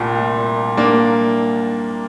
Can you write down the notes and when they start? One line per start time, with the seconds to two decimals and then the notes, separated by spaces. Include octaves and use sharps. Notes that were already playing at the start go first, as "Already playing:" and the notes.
Already playing: C2 A#2 G3 A3
0.77 A#3 D4